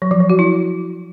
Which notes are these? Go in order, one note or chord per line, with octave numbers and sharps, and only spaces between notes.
F#3
F3
F#3
F#4
E4